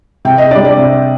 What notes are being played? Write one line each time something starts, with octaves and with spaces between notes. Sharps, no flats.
C3 G5
D#5
G3 D4 D5
D5
C3